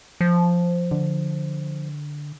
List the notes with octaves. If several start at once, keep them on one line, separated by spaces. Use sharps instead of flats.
F3
D3